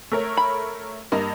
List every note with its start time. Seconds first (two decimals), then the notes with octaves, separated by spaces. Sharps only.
0.12 A3 A#4 C#5
0.37 B5
1.12 G2 A#3 D#5